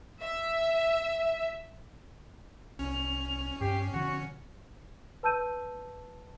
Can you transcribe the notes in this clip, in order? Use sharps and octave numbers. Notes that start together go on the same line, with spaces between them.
E5
C2 C#4 F7
G2 G4 C7
B2 D3 F3 F#4 C#7
B4 A5 E6 G6 D#7